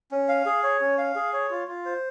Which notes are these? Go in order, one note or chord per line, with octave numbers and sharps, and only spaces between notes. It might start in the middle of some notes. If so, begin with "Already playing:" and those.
C#4
F5
G#4
C#5
C#4
F5
G#4
C#5
F4
F4
C5